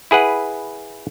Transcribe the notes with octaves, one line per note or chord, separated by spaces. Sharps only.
E4 G#4 B4 F#5